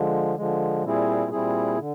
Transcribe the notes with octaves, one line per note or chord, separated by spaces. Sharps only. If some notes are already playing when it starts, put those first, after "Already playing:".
Already playing: D3 F3 G#3
D3 F3 G#3
A#2 G3 C4 E4 G#4
A#2 G3 C4 E4 G#4
D3